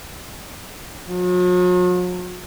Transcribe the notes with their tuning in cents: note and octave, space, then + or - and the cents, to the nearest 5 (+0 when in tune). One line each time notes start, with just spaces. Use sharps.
F#3 -45